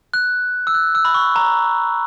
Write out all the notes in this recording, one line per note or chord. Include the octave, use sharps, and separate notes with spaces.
F#6
E6
F#6
E6
B5
C#6
A#5